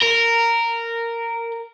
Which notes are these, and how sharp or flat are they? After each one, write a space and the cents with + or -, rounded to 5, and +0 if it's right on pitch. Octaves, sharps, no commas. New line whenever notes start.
A#4 -10